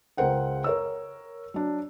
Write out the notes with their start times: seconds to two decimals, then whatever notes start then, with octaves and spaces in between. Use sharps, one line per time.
0.17 C#2 G#3 A#4 C5 F#5 G5
0.64 A#4 C#5 E6
1.54 F#3 D4